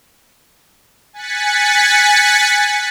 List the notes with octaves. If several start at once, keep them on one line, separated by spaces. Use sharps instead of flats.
G#5 F#6 A6 B6 C#7